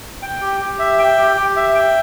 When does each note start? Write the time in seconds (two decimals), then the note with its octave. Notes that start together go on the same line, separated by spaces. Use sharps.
0.22 G5
0.41 G4
0.60 G4
0.79 E5
0.99 G5
1.18 G4
1.37 G4
1.56 E5
1.75 G5